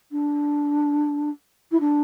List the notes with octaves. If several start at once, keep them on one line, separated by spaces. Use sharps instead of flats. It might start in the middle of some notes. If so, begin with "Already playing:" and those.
D4
E4
D4